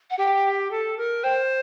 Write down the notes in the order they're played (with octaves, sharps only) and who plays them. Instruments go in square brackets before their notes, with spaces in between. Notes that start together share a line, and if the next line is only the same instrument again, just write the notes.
[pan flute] F#5
[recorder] G4 [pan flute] G5
[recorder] A4
A#4
[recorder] C5 [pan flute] G5